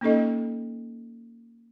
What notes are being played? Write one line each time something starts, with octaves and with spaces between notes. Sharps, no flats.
A#3 C#4 D#4 A4 D#5